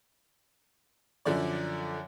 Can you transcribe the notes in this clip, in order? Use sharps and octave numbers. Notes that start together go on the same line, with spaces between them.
F#2 D3 F3 D5